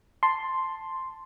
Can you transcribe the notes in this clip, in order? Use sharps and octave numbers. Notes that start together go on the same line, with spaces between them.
A5 C6